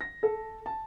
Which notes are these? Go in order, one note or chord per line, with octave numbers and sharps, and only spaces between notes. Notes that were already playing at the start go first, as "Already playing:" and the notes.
A#6
A4
A5